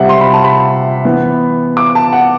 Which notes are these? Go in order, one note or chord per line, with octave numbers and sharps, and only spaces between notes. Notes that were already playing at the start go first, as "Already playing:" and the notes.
Already playing: C3 G3 C4 E5 F#5
C6
B5
A5
B5
E3 B3
D6
A5
F#5